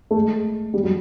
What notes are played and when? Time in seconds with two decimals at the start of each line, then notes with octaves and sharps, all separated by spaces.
0.11 A3
0.15 G#3
0.74 G3
0.83 F#3